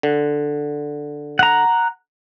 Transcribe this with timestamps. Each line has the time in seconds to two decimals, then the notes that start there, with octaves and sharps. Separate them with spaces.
0.03 D3
1.39 F#5 A#5